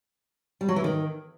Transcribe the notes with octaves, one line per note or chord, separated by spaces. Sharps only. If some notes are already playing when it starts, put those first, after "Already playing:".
G3
F#3
E3
D#3